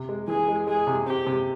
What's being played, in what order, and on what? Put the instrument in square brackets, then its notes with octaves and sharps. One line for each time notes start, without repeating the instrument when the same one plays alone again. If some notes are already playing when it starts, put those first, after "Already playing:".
Already playing: [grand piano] C3
G#3
[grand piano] E3 [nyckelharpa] G#4
[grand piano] G#3
[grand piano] G#3 [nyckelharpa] G#4
[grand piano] C3
[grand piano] C4 [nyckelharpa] G4
[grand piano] C3